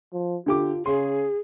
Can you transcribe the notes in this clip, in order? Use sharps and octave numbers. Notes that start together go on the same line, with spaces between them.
F3
D3 F4 G4 D6
C#3 G#4 C6